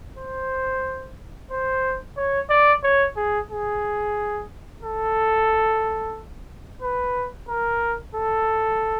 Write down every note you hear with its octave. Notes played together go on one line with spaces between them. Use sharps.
C5
C5
C#5
D5
C#5
G#4
G#4
A4
B4
A#4
A4